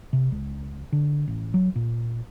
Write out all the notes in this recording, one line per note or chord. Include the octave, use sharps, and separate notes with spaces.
C3
C#2
D3
A1
F#3
A#2